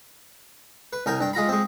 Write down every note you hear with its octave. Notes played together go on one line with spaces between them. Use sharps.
B4
C2 A#4 G5 G#5
G2 G5
G#3 F4 A#5 B5
G#3 C4